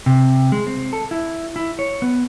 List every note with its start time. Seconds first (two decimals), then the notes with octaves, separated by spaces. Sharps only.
0.06 C3
0.52 G#3
0.67 C4
0.93 A4
1.11 E4
1.56 E4
1.79 C#5
2.02 B3